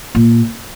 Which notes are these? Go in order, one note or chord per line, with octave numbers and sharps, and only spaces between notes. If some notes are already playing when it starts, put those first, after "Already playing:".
A#2